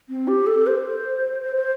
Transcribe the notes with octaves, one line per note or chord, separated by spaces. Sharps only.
C4
G4
A4
C5
C5
C5